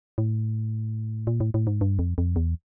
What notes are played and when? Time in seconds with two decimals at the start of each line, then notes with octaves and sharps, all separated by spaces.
0.18 A2
1.27 A#2
1.40 A2
1.54 A2
1.67 G#2
1.81 G2
1.99 F2
2.18 F2
2.36 E2